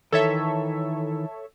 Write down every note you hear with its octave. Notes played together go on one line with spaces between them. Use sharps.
D#3 E3 A4 C#5 E5